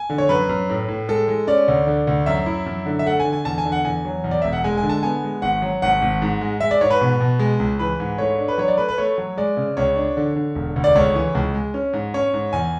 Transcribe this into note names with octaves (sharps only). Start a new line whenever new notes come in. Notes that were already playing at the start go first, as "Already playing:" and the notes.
Already playing: G#5
D3
C#5
F#2 B4
F#2
A2
A2
G#3 A4
G#3
C#4 D5
D2
D3
D2
F#2 E5
E4
F#2
D3
E5
A3 F#5
G#5
D3
G#5
E2 A5
G#5
D3
F#5
E2 G#5
F#3
E2
D5
E1 E5
F#5
G#3 G#5
G#5
D3
A5
B3 G#5
G#3
G#1 F#5
F#3
G#1 F#5
G#1
G#2
G#3
G#3 E5
D5
G#2 C#5
B4
B2
B2
G#3
C#2
E3 B4
G#2
A3 C#5
D4
B4
F#3 C#5
D5
A3 B4
B4
A3 C#5
F#3
G#3 D5
C#3
C#2 C#5
D4
D3
D3
E1
D2
D5
C#2 C#5
E3
C#2
G#3
C#4
G#2
C#4 C#5
G#2
E2 G#5